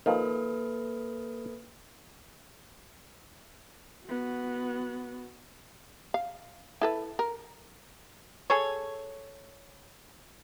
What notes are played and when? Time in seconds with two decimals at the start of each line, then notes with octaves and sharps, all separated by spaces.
0.06 D#3 F3 A#3 A4 B4
4.06 B3 F#4
6.14 F5
6.81 E4 A4 B4
7.19 A#4
8.50 G#4 A4 C#5